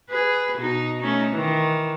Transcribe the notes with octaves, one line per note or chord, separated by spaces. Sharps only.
G#4 B4
B2 D#4
A3 C#4 D#4
D#3 E3